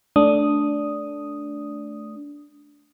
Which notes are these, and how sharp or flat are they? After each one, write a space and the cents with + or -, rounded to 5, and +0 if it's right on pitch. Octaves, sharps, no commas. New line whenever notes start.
A3 -10 D4 -10 D#6 +0